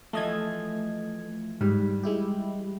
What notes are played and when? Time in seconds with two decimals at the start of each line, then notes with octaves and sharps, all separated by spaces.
0.13 E3 F3 A3 D#5 G#6
1.61 G#2 G3
2.03 G#3 E4 G4